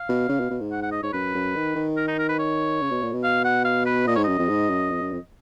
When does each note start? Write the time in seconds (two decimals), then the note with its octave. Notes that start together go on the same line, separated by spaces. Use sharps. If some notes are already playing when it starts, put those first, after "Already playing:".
Already playing: F5
0.09 B2
0.29 C#3
0.40 B2
0.51 B2
0.61 G#2
0.72 F#5
0.83 F#5
0.92 D#5
1.03 G#2 C#5
1.13 F#2 B4
1.35 F#2
1.56 D#3
1.76 D#3
1.97 A#4
2.08 D#4
2.19 A#4
2.29 B4
2.39 C#5
2.82 C#3
2.91 B2
3.03 A#2
3.12 B2
3.24 F5
3.45 F#5
3.65 F5
3.86 B4
4.06 A#2 D#5
4.16 G#2 C#5
4.24 F#2 D#5
4.39 F2
4.49 G#2
4.69 F#2
4.90 F2
5.01 F#2
5.12 F2